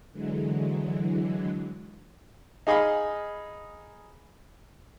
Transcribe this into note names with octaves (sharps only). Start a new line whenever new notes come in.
D3 E3 F#3 G#3
D#4 G#4 D#5 F5 B5